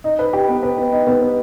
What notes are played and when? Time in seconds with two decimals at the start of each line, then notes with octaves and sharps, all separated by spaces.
0.04 D#4
0.19 B4
0.33 G4
0.48 B3
0.63 B4
0.77 B3
0.92 D#4
1.07 B3
1.21 B4